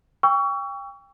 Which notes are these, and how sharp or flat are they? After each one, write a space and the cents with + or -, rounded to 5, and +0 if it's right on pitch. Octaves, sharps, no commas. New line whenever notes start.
G5 +30 C#6 +30 E6 +25